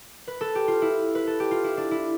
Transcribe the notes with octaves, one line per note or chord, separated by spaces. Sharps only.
B4
A4
G4
F4
E4
B4
A4
G4
F4
E4
D4
E4